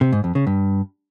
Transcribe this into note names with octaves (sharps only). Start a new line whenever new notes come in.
C3
G#2
F2
C#3
G2